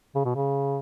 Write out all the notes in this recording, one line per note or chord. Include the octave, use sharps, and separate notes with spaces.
C#3
B2
C#3